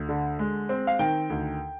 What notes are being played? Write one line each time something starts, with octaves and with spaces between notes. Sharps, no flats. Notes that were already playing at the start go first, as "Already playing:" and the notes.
Already playing: D2
D3
G#3
C4
F5
D#3 G5
D2